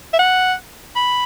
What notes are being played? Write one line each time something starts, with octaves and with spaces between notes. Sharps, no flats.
E5
F#5
B5